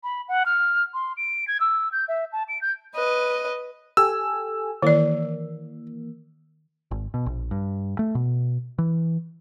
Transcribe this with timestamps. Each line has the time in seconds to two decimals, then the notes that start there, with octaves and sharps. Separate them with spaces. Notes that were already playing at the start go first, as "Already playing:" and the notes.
0.04 B5
0.28 F#5
0.46 F6
0.94 C6
1.17 D7
1.48 G#6
1.60 E6
1.92 G6
2.08 E5
2.33 A5
2.49 D7
2.61 G6
2.95 B4 D#5
3.97 G4 A4 G#5 E6
4.82 D#3 E3 A#3 D5
6.91 G#1
7.14 B2
7.26 A#1
7.51 G2
7.99 A3
8.15 B2
8.78 E3